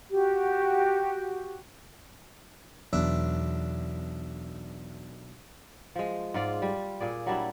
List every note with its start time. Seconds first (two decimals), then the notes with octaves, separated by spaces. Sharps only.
0.11 F#4 G4
2.93 B1 E2 D4 E5
5.96 F3 G#3
6.34 G#2 F4 D5
6.62 G3
7.01 A#2 G#4 D5
7.26 F#3 G3 D4 E4